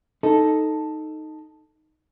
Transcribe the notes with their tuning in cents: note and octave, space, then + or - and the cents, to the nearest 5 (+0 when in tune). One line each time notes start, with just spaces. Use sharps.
D#4 +0 A4 +0